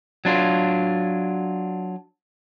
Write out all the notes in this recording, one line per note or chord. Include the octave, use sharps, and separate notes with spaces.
F#3 D4 F4